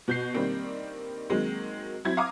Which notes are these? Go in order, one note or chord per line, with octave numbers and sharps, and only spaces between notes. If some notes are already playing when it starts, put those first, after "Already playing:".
B2 G6 C7
D#3 G3 A#3 C4 D4
D#3 F#3 G#3 A#3 C4
F#3 C4 E4 G#6
F5 A#5 D6 D#6